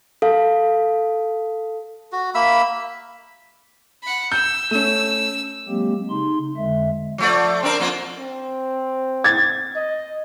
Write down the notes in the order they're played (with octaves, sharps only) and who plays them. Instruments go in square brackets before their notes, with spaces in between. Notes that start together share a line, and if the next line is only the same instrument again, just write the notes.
[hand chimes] A4 F5
[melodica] F#4
A#3 E5 B5 E6
[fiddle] F#5 B5
[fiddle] E6 [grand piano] G6
[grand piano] A3 C#4 [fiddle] E6
[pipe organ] F#3 G#3 A#3 C4 G4
C#3 D#4 C6
F2 D3 G#3 E5
[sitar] F3 A3 D5
C4 D4 A#4
F2 A#3 F4
[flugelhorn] C4
[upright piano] G#6 A6
[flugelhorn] D#5